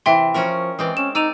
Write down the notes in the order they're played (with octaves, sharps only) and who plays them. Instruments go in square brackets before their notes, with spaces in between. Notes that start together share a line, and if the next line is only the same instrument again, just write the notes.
[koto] C3 E3 [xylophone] E5 G5 C6
[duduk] F3 [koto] C#4 F#4 A#4
[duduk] E3 [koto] G#3 C4 D5
[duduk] C#4 [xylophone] E7
[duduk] D#4 [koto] D5 [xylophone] E6 D#7 F7